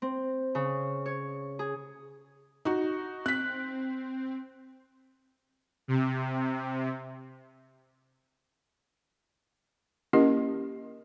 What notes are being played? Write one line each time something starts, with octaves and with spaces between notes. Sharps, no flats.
C4
C#3
C#5
G#4
D#4 F#4
C4 F#6 B6
C3
A#3 C#4 E4 G4 A#4 D#5